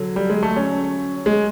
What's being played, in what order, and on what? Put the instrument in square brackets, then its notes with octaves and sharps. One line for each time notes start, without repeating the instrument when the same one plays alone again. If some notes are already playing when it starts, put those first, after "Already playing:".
Already playing: [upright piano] D3 F#3
[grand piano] G3
G#3
A3
C#4
G#3